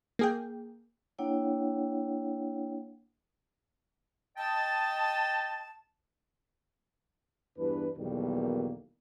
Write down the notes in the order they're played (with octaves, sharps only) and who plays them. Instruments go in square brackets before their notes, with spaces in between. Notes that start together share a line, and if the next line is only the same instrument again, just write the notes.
[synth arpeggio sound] A#3 G#4 G5
[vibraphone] A#3 D4 E4 C#5 F#5 G5
[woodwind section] D#5 G5 A5
[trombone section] E2 G2 E3 D4 B4
B1 E2 B2 D#3 G3 A#3